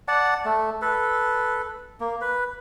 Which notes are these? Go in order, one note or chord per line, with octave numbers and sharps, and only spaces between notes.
D5 F#5 A5
A3
A4 B4
A#3
B4